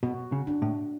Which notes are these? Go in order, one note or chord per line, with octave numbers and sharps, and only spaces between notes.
B2 F#4
C#3
D4
A2